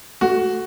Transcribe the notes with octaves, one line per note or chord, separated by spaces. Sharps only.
A3 F#4